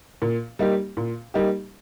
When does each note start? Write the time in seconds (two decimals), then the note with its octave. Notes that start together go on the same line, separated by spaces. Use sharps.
0.22 A#2
0.59 G3 A#3 D#4 G4
0.97 A#2
1.34 G3 A#3 D#4 G4